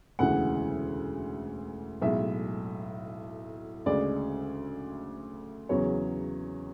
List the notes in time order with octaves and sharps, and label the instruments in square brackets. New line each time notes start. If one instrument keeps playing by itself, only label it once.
[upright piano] E1 D2 C#3 E3 F#5
B1 A2 G#3 E5
D2 C#3 G#3 D5
E2 C#3 F#3 C#5